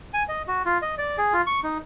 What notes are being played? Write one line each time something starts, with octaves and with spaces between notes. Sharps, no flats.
G#5
D#5
F#4
F4
D#5
D5
G#4
F4
C#6
D#4